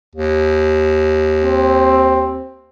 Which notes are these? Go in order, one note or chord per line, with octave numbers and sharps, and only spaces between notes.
D#2
C4